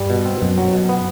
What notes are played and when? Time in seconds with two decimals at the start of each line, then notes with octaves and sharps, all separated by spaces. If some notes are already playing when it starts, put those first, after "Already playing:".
Already playing: G2 G3
0.10 B2
0.25 C4
0.41 F#2 B2
0.58 F#3
0.73 B2
0.89 B3